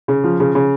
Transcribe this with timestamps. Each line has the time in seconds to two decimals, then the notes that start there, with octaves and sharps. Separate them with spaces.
0.08 C#3
0.24 F3
0.40 C#3
0.55 C#3